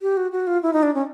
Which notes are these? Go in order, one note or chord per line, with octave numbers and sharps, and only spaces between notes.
G4
F#4
F#4
F4
E4
D#4
D4
C#4